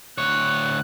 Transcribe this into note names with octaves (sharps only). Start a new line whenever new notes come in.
D2 C#5 F#6